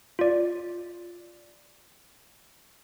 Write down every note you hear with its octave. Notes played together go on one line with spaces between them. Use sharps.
F4 D5